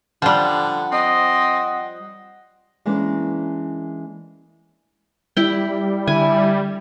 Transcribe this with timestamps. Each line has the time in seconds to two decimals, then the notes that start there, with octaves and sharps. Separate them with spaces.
0.22 D3 F3 G3 F#5
0.92 C4 D#5
2.86 E3 G#3 A#3 C#4 D4
5.37 G3 E4 G5
6.07 D3 E4 G#5